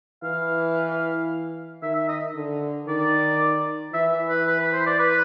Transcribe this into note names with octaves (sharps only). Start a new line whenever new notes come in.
E3 F5
D#3 E5
E5
D#5
D3
D#3 D5
E3 E5
E5
B4
B4
B4
C5
D5
B4